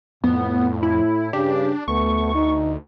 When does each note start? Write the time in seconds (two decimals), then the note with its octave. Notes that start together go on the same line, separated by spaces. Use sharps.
0.24 F2 A2 B3
0.83 E4
1.33 G2 C#3 D4 G4
1.88 D2 A3 B3 C#6
2.35 D#4